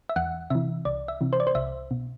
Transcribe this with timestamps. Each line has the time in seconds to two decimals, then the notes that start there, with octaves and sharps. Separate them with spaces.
0.09 E5
0.16 E2 F#5
0.50 C3 E3 E5
0.85 C2 D5
1.08 E5
1.21 C3 E3
1.33 C5
1.40 D5
1.47 C5
1.55 C2 E5
1.91 B2